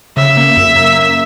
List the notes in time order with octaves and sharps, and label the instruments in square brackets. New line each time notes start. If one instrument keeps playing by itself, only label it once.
[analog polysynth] C#3 [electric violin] E5
[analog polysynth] A#3
F#2
A#3
A#3